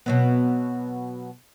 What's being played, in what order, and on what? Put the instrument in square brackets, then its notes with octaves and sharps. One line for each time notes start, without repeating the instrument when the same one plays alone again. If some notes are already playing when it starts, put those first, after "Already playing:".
[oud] B2 F#3 B3